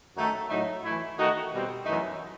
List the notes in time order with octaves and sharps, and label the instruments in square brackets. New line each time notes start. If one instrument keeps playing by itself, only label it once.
[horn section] F#2 D#3 F#3 A3 D#4
A2 F#3 A3 D#4
E3 A3 E4
D#3 A3 D#4 F#4
B2 G3 C4
F#2 E3 A3 D#4